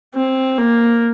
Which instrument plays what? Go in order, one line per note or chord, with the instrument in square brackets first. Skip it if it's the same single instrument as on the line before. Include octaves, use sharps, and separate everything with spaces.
[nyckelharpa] C4
A#3